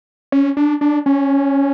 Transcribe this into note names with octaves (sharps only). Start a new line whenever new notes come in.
C#4
D4
D4
C#4